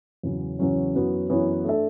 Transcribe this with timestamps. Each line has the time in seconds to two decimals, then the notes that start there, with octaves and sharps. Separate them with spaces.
0.23 E2 C#3 F#3 C#4
0.59 E2 C#3 F#3 C#4
0.95 F#2 E3 B3 F#4 C#5
1.29 F#2 E3 B3 F#4 C#5
1.65 A3 D4 A4 E5